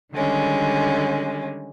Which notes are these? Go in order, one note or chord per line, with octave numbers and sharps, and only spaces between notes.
D3 D#3 G3 G#3 C#4